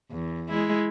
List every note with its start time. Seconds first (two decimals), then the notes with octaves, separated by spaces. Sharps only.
0.11 E2
0.49 G#3 E4